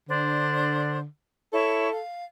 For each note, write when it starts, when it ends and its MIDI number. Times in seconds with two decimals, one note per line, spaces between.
0.09 1.05 50
0.09 0.98 62
0.09 0.98 72
1.53 1.89 64
1.53 2.00 69
1.53 1.89 73
1.53 1.89 85
1.91 2.25 77